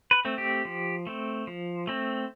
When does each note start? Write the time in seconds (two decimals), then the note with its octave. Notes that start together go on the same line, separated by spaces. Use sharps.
0.11 B4
0.25 A3 C4
0.38 G4
0.65 F3
1.07 A3 C4
1.47 F3
1.87 A3 C4